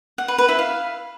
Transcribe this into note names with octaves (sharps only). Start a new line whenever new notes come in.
F#5
B4
B4
E4
F5